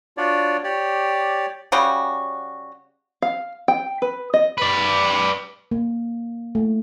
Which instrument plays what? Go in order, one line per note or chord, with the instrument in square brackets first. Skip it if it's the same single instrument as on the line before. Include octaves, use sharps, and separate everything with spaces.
[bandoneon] D4 F4 F#4 C#5 D5
G4 C#5 D5
[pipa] C#3 G3 C#4 F#4
[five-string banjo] F5
G5
B4
D#5
[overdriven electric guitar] B4 D5
[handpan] A#3
A3